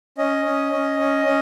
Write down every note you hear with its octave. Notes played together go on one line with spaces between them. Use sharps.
C#4 D#5
C#4
C#4
C#4
C#4